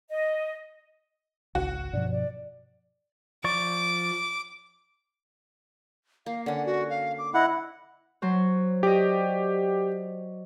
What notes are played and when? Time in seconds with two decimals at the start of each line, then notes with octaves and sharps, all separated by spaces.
0.10 D#5
1.55 G#1 C#2 F#4
1.93 G2 B2 F3 D5
2.11 D5
3.44 F3 D5 C#6 D6
6.26 A#3 F5
6.46 D3 C#4 F#5
6.66 F#4
6.90 F5
7.19 D6
7.34 E4 D#5 F#5
8.22 F#3 C5 C#5
8.83 G4 D5 D#5